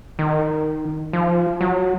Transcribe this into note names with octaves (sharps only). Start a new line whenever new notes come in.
D#3
F3
F#3